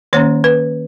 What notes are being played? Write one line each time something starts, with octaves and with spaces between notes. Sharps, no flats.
D#3 A#3 C#4 C#5
B4